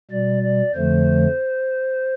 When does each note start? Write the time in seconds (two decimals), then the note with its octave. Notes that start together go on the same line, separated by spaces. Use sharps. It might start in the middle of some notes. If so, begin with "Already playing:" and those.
0.11 B2 G3 D5
0.43 D5
0.75 F2 D3 F3 A3 C5